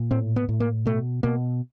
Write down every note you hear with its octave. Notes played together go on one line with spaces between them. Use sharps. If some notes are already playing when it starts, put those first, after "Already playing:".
Already playing: A#2
A2 C4
B3
A2
A#3
B2 A3
B2 A#3